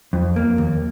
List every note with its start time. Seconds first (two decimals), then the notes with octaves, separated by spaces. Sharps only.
0.13 F2
0.36 A#3
0.58 D#2